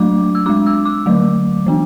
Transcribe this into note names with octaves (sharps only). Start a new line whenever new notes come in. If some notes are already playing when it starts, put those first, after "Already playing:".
Already playing: F#3 A3 D4 D6
E6
G#3 D4 D6
E6
D6
D3 F#3 A3
E3 B3 D4